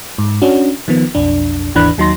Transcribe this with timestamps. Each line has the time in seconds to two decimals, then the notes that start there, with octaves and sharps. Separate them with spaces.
0.18 G#2
0.42 C#4 D4 F#4
0.88 D#3 F3 B3
1.15 B1 F2 D4
1.75 G#1 D#2 E3 D4 B5 F#6
1.98 D#2 F#3 D#4 C6 A#6